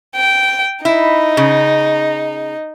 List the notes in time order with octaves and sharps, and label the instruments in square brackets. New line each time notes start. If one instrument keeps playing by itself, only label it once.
[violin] G5
[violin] D#4 [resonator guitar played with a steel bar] E4
[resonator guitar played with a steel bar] C#3